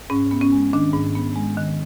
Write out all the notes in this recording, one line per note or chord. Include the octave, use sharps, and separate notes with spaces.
G#2 C#4
B3
C#4
G#3
D#3 D4
G#2
B3
G#3
D#3